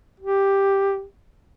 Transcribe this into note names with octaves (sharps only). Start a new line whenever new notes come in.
G4